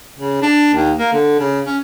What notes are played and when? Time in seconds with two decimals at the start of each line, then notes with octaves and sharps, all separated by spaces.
0.18 C#3
0.42 D4
0.74 D#2
0.99 A#3
1.13 D3
1.39 C#3
1.66 C#4